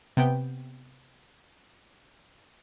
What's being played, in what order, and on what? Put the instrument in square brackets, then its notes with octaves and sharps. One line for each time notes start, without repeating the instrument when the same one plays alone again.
[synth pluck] C3 B3 G5